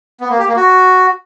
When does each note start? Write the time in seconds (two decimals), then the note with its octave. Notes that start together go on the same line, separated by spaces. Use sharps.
0.21 B3
0.30 A#3
0.39 G4
0.47 A#3
0.56 F#4